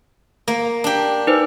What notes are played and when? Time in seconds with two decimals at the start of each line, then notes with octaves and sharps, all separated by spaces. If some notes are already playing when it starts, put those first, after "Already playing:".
0.48 A#3
0.84 D4 G4
1.27 D#4 B4 C5